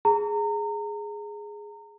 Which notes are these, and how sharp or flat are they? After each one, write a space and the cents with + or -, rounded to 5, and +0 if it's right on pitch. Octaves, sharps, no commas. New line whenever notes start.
G#4 +0 A#5 -30